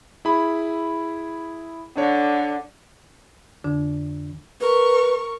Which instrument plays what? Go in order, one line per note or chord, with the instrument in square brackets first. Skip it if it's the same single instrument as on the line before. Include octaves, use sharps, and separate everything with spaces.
[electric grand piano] E4 G#4 B5
[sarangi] D3 [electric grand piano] D4 C#5
[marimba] F2 D3 D4
[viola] A#4 C#6 [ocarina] B4